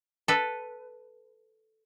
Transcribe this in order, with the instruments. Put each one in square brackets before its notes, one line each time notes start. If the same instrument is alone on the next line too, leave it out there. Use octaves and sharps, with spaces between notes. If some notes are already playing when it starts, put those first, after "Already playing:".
[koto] A4 B4